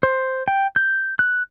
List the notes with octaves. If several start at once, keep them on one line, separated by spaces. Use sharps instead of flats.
C5
G5
G6
F#6